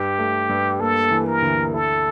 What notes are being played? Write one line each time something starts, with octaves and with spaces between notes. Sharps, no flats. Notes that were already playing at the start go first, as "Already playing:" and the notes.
Already playing: G2 G4
A3
G2
A#3 A4
E3
A#4
D2
E4 A4